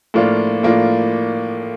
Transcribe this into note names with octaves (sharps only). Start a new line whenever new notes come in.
A2 F3 A#3 D4 F4
A2 F3 A#3 D4 F4